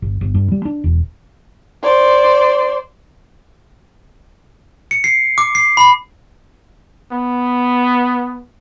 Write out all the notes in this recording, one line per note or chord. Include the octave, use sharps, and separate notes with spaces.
G1
G1
G2
G3
D4
E1
C5 D5
C#7
C7
D6
C7
B5
B3